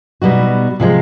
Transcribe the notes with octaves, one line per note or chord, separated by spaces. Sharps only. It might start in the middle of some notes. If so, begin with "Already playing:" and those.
B2 G3 B3 D#4 F#4
C3 F3 G#3